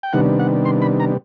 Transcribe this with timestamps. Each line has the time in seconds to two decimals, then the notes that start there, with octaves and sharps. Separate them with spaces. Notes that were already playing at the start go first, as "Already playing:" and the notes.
0.03 G5
0.13 C3 D#3 G3 B3 D4 F#5
0.39 F#5
0.65 C6
0.82 B5
1.00 A#5